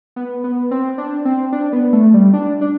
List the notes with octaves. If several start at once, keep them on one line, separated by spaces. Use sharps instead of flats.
B3
B3
C4
D4
C4
D4
B3
A3
G3
D4
D4